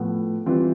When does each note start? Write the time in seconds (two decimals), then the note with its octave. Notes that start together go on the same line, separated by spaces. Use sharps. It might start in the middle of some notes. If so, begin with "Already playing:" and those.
Already playing: A2 F3 B3
0.46 E3 G3 C4 F4